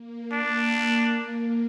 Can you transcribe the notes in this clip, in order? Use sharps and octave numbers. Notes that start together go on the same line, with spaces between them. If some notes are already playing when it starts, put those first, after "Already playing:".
Already playing: A#3
D4
A#3